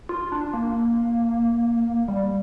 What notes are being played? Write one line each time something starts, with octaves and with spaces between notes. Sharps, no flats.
F4
D4
A#3
G3